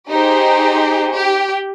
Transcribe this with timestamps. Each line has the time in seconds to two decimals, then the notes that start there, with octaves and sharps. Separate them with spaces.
0.11 D#4 G4 G#4 C5
1.15 G4